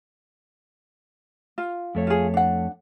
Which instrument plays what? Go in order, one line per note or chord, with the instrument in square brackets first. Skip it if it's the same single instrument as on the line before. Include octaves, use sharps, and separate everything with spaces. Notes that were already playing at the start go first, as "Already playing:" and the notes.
[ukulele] F4
[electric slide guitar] F2 A3 C#5
[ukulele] F4 G#4
D4 F#5